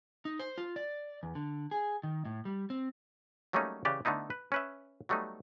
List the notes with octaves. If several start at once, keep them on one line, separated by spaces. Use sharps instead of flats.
D#4
C5
F4
D5
E2
D3
G#4
D#3
A2
G3
C4
F#3 G3 A3 A#3 C#4 D#4
C#3 E3 G4 B4 D5 G5
D3 A3 B3 D#4 E4
B4
C#4 B4 E5
F#3 G3 A3 B3 D#4